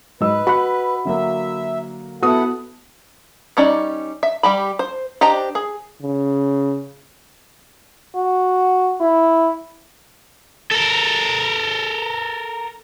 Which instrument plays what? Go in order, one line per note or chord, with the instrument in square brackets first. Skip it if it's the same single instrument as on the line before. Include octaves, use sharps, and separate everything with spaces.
[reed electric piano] G#2 F#3 [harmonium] B4 [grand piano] D#5 E6
[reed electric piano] F#4 F#5 [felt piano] B5
[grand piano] D3 F#3 A#3 [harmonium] E5
[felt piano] B3 D#6 [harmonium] E4 A4 F#5 [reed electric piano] F#4
[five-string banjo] G3 C#4 D#4 D5
E5
G3 G4 B5
C5
D4 G4 C5 D#5 A#5
G#4
[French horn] C#3
[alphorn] F#4
E4
[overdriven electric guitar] A4 A#4